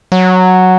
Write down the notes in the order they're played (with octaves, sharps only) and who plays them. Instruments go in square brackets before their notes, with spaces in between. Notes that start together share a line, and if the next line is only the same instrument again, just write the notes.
[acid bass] F#3